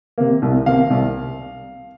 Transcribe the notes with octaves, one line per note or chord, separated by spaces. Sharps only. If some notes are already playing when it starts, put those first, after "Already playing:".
C3 A#3
C2
C3 A#3 F5
C2